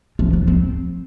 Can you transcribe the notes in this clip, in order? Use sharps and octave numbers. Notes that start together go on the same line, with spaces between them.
F3
F3
C4